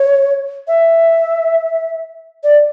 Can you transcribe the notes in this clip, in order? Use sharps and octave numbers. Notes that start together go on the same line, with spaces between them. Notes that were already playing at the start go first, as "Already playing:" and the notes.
Already playing: C#5
E5
D5